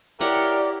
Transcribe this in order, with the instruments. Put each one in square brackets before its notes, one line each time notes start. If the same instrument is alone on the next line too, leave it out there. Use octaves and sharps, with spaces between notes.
[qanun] E4 C#5 F#5 [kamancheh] G4 [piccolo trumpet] A#4 [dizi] D5